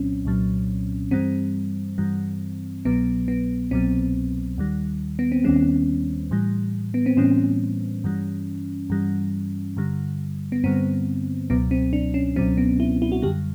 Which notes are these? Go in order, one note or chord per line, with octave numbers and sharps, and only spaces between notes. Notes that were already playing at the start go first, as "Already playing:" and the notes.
Already playing: C2 A#2 F#3 C4 C#4
C2 A#2 F#3
G2 E3 G3 C4
G2 E3 G3
C2 B2 F#3 B3
B3
C2 B2 F#3 C4
D#2 D#3 G3
B3
C4
D#2 D#3 G3 C#4
A2 E3 G3
B3
C4
A2 E3 G3 C#4
G2 E3 G3
G2 E3 G3
G2 D3 G3
B3
G2 D3 G3 C4
C#2 B2 F#3 B3
C4
D4
C#4
C#2 B2 F#3 C4
B3
E4
E4
F#4
F#2 D3 G3 G4